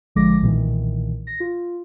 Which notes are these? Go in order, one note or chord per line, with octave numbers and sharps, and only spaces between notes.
A1 D3 F3 G#3 D6 A#6
B1 A#2 D#3 E3
A#6
F4